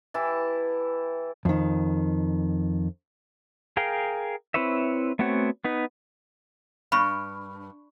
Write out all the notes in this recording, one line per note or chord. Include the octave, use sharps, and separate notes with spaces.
E3 E4 G4 A5
F2 D#3
G#4 A#4 F5 G5
C4 E4 B4 C#5 E5
A3 B3 C4 F#4 C#5
B3 D#4 B4
G2 B5 C#6